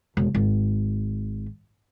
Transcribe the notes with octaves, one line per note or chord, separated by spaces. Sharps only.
E1
G#1